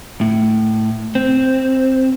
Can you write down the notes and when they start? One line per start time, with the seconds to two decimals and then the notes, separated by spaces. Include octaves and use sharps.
0.21 A2
1.15 C4